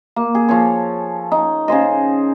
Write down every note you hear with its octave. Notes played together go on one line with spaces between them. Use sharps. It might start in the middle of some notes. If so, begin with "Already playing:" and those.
A#3
G#4
F3 A4 C#5
D#4
C#3 G#4 C5 D#5